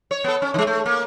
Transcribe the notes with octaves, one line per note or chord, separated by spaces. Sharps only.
C#5
B3 A4
C#4
D#3 G#3
A3
A#3